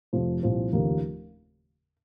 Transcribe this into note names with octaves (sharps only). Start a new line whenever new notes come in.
F1 F2 C3 F3
C2 A#2 F3 C4
F1 D#2 C#3 F3 A#3